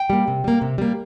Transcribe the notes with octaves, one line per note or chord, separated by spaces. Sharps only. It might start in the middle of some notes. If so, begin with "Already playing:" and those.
Already playing: G5
G3 A#3
C3
G3 A#3
C3
G3 A#3